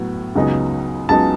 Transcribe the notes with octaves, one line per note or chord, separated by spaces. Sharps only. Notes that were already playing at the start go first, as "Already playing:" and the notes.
Already playing: A2 F#3 B3
C#2 C#3 F#3 B3 D#4
C#2 C#3 F#3 B3 D#4 A5